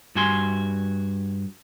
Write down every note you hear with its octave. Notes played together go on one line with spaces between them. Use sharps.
G2 F#4 G#5 C6